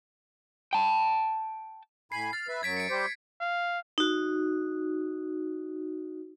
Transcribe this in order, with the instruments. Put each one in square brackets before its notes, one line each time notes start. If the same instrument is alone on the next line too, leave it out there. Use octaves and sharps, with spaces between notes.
[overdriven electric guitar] G5 A5
[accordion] A2 G#5 B5 [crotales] C7
[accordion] F6 [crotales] A6
[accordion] B4 E5
[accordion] F#2 F#3 [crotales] G#6 B6 D7
[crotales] C#7 D7
[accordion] G3 G4 C5
[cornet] F5
[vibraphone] D#4 F#4